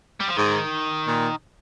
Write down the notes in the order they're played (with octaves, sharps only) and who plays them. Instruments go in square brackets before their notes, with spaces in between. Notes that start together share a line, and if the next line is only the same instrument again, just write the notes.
[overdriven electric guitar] G3
F3
[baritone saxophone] G#2 [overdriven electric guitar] D#3
[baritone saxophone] A#2